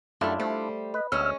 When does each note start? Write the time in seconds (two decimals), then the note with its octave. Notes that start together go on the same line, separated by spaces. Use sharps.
0.21 F#2 G3 A3 D4 E4 F4
0.40 G3 A3 C5
0.94 B4 D#5
1.12 D2 G#3 C#4 E6 F6